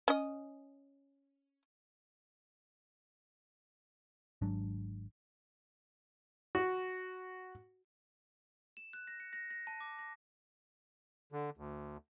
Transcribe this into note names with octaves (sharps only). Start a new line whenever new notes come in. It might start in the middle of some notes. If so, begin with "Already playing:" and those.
C#4 D#5
G#1 G#2 F#3 D4
F#4
E7
F#6
A#6
C#7
A#6
A#6
A5
D6
A#6
D3
D2